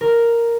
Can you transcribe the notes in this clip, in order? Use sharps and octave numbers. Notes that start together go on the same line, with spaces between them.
A#4